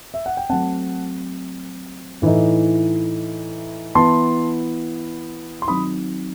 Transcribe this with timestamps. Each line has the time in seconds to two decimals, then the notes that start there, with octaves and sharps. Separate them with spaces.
0.14 E5
0.26 F#5
0.37 G5
0.50 F#3 A3 C4 F#5 A5
2.22 A2 E3 A3 D#4
3.95 E3 B3 E4 A5 C6
5.62 C6
5.67 D#3 F#3 C4 D#4 B5 D#6